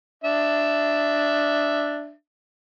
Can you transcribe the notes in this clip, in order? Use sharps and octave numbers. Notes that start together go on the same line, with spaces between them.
D4 E5